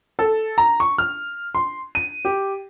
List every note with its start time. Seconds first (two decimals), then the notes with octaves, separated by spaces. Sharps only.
0.19 A4
0.58 A#5
0.80 C#6
0.98 F6
1.55 C6
1.95 D#7
2.25 G4